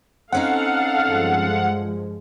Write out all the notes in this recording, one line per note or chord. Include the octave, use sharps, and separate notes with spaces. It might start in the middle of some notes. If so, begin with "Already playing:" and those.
C4 C#4 D#4 A4 F5 F#5
G2 F3 G#3